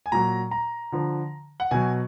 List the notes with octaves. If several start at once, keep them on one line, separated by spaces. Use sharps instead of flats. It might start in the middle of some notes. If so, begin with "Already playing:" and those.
G#5
A#2 F#3 A#5
A#5
D3 F3
F#5
B2 F#3 G#5